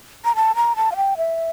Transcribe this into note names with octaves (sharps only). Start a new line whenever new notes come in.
A#5
A5
A#5
A5
F5
G5
E5